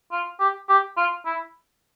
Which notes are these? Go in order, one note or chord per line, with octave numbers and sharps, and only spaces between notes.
F4
G4
G4
F4
E4